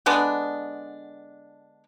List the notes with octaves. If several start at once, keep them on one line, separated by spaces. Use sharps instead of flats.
D3 G#3 B3 D4